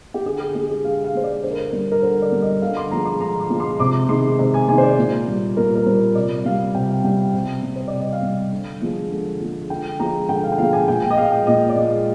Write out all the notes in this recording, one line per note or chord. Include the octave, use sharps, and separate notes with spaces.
G4
D3 G#4
G#4
G#3 G4
G#4
D3 F5
F5
G#3 C5
D5
D3 C5
A#4
C5
G3 A#4
A#4
D3 C5
D5
G3
D#5
D3 F5
C6
F3 G#3 A#5
C6
D3 A#5
C6
F3 G#3
C6
C3 D6
D#3 G#3 C6
C3
G#5
D#3 G#3 G#5
C5
D5
A#2
G3
A#2 A#4
A#4
G3 C5
C3 D5
G3 F5
C3 G5
G3 G5
C3
G3
C5
D5
C3
D#5
F5
G3
D3
F3 G#3
D3
F3 G#3
D3 G5
F3 G#3 A#5
D3 G5
F5
G5
F3 G#3 F5
G#5
A#2 G5
G5
D#5
G#3 F5
G5
A#2 D#5
D5
G#3 D#5